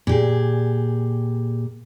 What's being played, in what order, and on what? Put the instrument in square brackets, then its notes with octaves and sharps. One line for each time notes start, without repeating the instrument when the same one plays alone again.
[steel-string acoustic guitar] A#2 G4 G#4